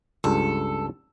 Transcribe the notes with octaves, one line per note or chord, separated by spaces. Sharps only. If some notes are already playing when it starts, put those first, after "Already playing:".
C#2 G2 A4